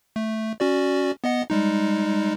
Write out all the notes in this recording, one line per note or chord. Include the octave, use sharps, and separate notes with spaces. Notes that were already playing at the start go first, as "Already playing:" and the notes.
A3
C#4 F#4 D5
B3 D#5 F#5
G3 G#3 D#4